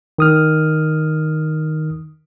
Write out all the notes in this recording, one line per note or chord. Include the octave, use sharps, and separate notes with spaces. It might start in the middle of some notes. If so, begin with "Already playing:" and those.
D#3 D#6 F6